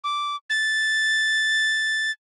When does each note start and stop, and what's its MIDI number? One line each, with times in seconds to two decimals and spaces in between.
0.04 0.36 86
0.50 2.11 93